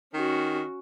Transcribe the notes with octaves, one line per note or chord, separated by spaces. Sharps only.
D#3 C#4 F#4